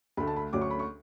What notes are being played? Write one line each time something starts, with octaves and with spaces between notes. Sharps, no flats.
D2 D3 A3 B5
A5
B5
D2 D3 F#3 C#4 D6
C#6
B5
C#6